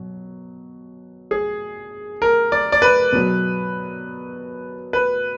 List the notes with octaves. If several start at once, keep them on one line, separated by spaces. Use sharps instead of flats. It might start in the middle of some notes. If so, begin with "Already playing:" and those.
Already playing: B2 F#3
G#4
A#4
D5
D5
B4
B2 F#3
B4